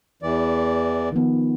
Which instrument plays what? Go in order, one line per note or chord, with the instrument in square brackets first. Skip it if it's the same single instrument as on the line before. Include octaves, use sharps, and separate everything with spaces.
[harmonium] E2 E3 D5
[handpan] D#3 F3 B3